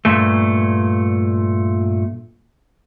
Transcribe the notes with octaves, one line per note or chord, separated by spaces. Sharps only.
G2 A#2 A3